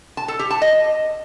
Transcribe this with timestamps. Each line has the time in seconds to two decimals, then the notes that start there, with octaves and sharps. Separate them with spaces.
0.17 A5
0.28 A4
0.39 G4
0.51 A5
0.62 D#5